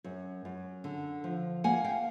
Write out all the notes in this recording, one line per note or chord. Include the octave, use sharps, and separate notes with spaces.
F#2
F#2
D3
F3
A#3 F#5 G#5
F5 G5